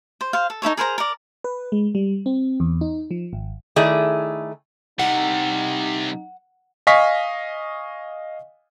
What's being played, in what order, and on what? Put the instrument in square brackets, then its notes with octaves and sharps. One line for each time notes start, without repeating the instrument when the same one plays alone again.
[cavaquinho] C5
C5 F5
A4
D#4 E4 A4 C#5
G#4 A#4 C5 A#5
A#4 D5
[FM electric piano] B4
G#3
G3
C4
E2
D#4
F3
G#1
[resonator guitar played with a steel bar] D#3 A3 E4 G#4 D5
[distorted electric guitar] C3 G3 [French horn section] D#4 [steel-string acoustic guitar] F#5
[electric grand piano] D#5 F5 G#5 C#6 B6